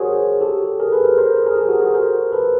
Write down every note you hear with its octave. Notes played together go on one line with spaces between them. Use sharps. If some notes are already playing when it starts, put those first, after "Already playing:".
Already playing: F#4 G#4 A#4 C5 C#5
G4 A4
G#4 A#4
A4 B4
A#4 C5
A#4 C5
G#4 A#4
G#4 A#4
G4 A4
F#4 G#4
F#4 G#4
A#4 C5
A4 B4